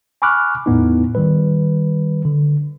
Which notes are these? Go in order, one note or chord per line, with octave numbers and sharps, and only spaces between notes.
G#5 B5 C#6 D6 F6 F#6
E2 A2 B3 D#4
D#3 G3 B4
D3